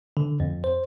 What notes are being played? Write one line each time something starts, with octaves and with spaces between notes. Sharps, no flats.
D3
F2
C5